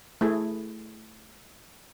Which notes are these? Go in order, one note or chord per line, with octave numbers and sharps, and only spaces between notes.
A3 E4 G#4